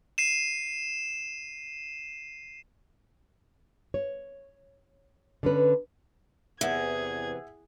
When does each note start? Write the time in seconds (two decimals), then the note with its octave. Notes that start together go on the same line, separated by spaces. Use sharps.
0.18 C7 D#7 E7
3.94 C#5
5.43 D3 C#4 B4
6.61 E2 C3 E3 G#4 E5 F#5 G#6